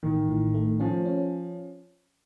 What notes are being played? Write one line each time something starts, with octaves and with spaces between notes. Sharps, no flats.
A1 D#3
A2
A3
F3 C#4
C#4